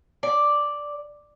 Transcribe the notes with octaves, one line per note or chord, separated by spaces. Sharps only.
D5